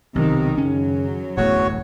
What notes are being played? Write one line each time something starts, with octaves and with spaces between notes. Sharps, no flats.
B1 C3 D#3
F#2 C#3 F#3 C#4
D1 A1 E2 A3 F#4 C#5